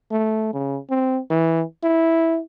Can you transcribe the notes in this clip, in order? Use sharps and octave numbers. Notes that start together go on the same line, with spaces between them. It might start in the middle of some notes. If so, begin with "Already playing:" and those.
A3
C#3
C4
E3
E4